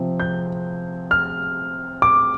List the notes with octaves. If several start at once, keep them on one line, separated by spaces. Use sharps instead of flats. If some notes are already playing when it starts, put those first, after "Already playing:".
Already playing: C3 F3 C4
G6
F6
D6